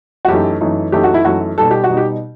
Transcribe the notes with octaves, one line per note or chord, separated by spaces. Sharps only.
F#4
F#2 E3 A3 D#4 G4
F#2 E3 A3 D#4
F#2 E3 A3 D#4 G4
F#4
E4
F#2 E3 A3 D#4 F#4
B2 G3 D#4 A4
G4
F#4
B2 G3 D#4
G4